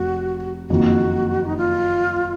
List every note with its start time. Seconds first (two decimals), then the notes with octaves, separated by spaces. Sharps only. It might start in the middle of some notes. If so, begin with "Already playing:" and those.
Already playing: F1 F#4
0.70 F#1 F2 D#3 A#3 F#4
1.46 D#4
1.57 F4